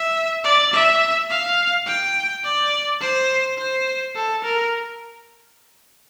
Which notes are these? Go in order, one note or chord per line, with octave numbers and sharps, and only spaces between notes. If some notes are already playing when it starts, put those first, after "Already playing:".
Already playing: E5
D5
E5
F5
G5
D5
C5
C5
A4
A#4